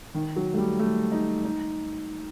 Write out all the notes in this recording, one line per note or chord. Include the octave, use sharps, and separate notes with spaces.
D#3
F#3
A3
G3
A3
D#4
D#4